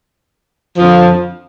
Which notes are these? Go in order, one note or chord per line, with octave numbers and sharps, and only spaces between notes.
F2 D3 F3